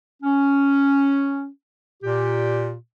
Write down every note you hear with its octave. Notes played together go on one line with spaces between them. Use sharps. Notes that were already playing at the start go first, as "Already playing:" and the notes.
C#4
A#2 G4